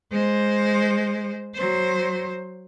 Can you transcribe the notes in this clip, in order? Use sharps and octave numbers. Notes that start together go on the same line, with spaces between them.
G#3 C5
F#3 C5